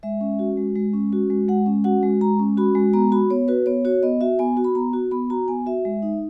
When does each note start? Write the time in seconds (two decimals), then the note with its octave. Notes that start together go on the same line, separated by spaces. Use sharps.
0.03 G#3 E5
0.21 C#4
0.39 F#4
0.57 G#3
0.75 G#3
0.93 C#4
1.13 F#4
1.30 G#3
1.49 G#3 F#5
1.66 C#4
1.84 F#4 F#5
2.03 G#3
2.21 G#3 A#5
2.39 C#4
2.57 F#4 B5
2.75 G#3
2.93 B3 A#5
3.12 F#4 B5
3.30 B3 C#5
3.48 F#4 B4
3.66 B3 C#5
3.85 F#4 C#5
4.03 B3 D#5
4.21 F#4 E5
4.39 B3 G#5
4.57 F#4
4.64 B5
4.75 B3 A#5
4.93 F#4
5.11 B3 B5
5.30 F#4 A#5
5.48 B3 G#5
5.66 F#4 E5
5.85 G#3
6.02 D#4